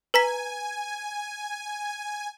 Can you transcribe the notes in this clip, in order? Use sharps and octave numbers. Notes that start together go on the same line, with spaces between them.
B4 G#5 A#5 B6